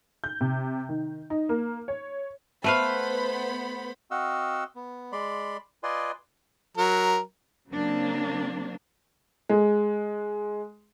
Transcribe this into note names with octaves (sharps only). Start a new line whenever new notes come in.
G6
C3
D#3
D#4
A#3
C#5
A3 B3 B4 C5 F5 B5
C4 F#4 D#5 F5 F#5 E6
B3
G#3 D5 B5 C6
F4 B4 D5 D#5 G#5 C6
F#3 A#4
C#3 F#3 A#3 C4 D4
G#3